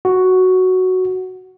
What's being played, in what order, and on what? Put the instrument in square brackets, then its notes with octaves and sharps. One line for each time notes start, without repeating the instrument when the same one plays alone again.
[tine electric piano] F#4